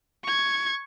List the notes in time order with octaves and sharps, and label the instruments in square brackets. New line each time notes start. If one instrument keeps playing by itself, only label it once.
[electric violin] C#6 G#6